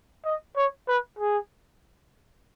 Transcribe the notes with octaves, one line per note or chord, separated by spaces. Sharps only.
D#5
C#5
B4
G#4